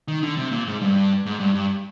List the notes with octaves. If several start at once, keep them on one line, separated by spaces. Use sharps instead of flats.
D#3
D3
C3
A#2
G#2
G2
G#2
G2
G2